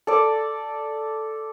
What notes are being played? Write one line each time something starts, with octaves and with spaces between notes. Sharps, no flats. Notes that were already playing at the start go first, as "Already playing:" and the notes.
A4 D5